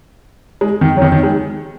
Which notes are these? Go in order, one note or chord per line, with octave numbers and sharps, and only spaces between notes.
G#3
D#3
F#3
D#3
D#3
G#3